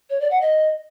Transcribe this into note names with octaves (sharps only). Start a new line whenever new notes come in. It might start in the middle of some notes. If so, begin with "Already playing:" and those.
C#5
D5
F#5
D#5